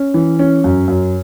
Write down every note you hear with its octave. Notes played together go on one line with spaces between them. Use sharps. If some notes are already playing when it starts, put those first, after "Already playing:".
Already playing: C#4
E3
C#4
F#2
F#2